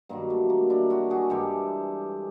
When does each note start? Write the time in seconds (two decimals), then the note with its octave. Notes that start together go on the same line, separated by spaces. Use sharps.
0.09 G2 D#3 F#3 A#3
0.30 A3
0.50 A#3
0.70 D4 E4
0.90 E4 F#4
1.10 F#4 G#4
1.30 G2 E3 G#3 G4 A4